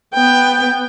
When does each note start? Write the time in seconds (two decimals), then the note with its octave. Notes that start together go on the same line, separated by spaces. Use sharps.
0.14 B3 G5